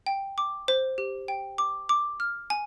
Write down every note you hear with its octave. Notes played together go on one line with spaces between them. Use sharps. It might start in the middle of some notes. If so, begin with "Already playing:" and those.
G5
D6
C5
G4
G5
D6
D6
F6
G#5